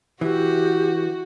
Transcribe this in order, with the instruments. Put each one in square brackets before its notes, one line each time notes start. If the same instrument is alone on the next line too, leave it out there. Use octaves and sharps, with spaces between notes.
[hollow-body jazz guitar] E3 [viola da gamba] F#4 [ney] G4